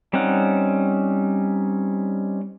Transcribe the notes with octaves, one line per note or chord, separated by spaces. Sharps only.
G3 C4 C#4 D#4 F#5